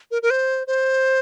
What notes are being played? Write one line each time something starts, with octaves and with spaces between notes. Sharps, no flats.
A#4
A#4
C5
C5